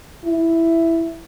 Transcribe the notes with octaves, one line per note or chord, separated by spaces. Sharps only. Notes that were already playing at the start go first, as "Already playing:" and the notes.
E4